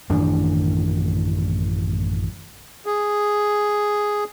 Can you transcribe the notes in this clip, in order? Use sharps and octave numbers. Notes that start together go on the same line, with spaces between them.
A1 F#2 D#3 D4
G#4